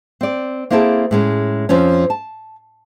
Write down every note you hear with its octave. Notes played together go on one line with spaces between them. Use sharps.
C4 D5
A#3 C4 E4 G#4 A4
A2 G#3 C#4
F2 F3 C4 C#4
A5